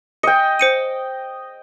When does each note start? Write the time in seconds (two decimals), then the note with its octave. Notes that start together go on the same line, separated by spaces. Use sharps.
0.23 D#5 G5 C#7
0.59 C5 C#7 D#7